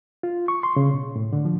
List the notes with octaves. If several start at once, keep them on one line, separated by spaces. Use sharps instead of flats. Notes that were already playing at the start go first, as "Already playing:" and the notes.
F4
C#6
C6
C#3
B2
A2
D3
F3